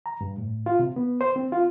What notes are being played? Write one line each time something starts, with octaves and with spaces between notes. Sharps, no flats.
A#5
G2
A2
F4
C3
B3
C5
C4
F4